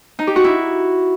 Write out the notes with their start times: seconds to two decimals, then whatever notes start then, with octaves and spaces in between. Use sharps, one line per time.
0.19 D#4
0.27 G4
0.36 F#4
0.44 E4